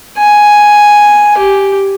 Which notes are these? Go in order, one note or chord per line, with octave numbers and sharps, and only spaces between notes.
G#5
G4